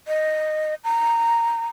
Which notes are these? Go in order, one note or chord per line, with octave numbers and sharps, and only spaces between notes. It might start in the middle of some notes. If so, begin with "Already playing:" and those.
D#5
A#5